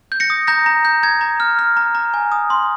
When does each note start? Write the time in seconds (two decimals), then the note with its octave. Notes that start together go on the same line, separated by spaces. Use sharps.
0.12 G6
0.20 A#6 C#7
0.30 D#6
0.47 A#5 G6 A#6
0.66 A#5
0.85 G6
1.03 A#5 G#6
1.21 A#5
1.40 F6
1.59 F6
1.77 A#5
1.95 A#5
2.14 G#5
2.32 D#6
2.50 C6